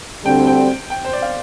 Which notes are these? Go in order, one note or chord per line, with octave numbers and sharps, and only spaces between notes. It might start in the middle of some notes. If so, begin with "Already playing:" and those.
D2 D3 G3 C4 G5
G5
G5
C5
D5
F5